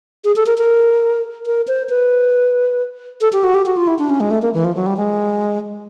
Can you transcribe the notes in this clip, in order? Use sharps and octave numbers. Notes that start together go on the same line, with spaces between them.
G#4
A4
A#4
A#4
A#4
C5
B4
A4
G4
F#4
G4
F#4
F4
E4
D4
C#4
G#3
A3
A#3
E3
F3
F#3
G3
G#3